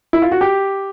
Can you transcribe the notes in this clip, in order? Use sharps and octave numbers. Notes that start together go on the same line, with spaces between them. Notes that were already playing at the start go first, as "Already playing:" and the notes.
E4
F4
F#4
G4